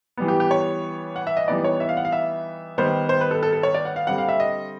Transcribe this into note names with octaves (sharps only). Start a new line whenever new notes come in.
E3 G3 B3
G4
G4
C#5
F#5
E5
D#5
E3 G3 B3 D#4 D5
C#5
E5
F5
F#5
F5
E5
D#3 G3 B3 C5
C5
B4
A4
A4
A4
C#5
D5
F#5
F5
D3 G3 C4 F#5
F5
E5
D#5